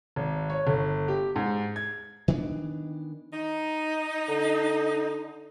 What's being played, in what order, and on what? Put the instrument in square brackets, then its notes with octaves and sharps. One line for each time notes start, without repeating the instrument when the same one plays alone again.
[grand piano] G#1
C#5
G1
G4
G#2
G#6
[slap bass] D#3 E3 B3 D4
[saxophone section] D#4
[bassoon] D3